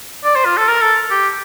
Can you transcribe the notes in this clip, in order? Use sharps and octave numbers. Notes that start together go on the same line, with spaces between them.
D5
C5
F4
A4
A#4
A4
G4